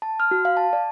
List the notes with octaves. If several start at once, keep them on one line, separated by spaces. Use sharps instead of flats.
A5
F6
F#4
F5
A5
D5